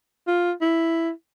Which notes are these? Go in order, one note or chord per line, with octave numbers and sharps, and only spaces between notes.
F4
E4